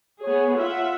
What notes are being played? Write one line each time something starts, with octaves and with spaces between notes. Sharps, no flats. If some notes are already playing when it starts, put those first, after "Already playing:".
B3 G#4 C#5
F4 E5 F#5